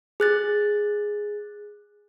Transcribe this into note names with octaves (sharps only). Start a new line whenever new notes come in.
G#4 F#6 A6